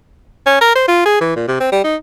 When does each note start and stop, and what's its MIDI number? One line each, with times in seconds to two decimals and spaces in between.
0.46 0.61 61
0.61 0.74 70
0.75 0.85 72
0.88 1.03 65
1.06 1.20 68
1.21 1.35 52
1.36 1.44 46
1.48 1.60 48
1.60 1.71 60
1.72 1.80 55
1.84 1.96 63